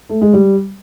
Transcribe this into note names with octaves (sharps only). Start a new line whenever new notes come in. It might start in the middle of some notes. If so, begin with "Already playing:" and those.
A3
G#3
G3